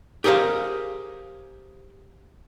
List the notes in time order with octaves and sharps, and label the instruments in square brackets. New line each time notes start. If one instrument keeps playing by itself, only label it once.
[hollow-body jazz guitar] G4 G#4 A#4 C5 F5